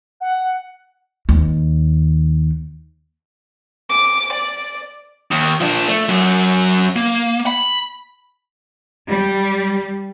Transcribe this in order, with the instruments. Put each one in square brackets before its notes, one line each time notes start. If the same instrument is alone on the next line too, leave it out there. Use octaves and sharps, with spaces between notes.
[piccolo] F#5
[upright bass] D#2
[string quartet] D6
D5
[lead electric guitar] D#2
F3 D4
A3
F#2 F#3
A#3
B5
[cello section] G3